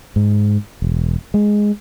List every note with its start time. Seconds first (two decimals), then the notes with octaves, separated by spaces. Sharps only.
0.16 G#2
0.82 E1
1.34 G#3